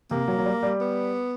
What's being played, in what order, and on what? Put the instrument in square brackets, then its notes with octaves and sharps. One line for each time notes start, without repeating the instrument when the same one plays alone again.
[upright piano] C3 [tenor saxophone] A#3
[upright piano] F#3
F#3
G3
G3
[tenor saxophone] B3